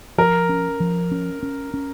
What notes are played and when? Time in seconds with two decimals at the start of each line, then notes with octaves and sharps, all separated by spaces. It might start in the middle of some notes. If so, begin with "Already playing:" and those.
0.18 F3 A#4
0.49 C#4
0.80 F3
1.12 C#4
1.43 C#4
1.74 C#4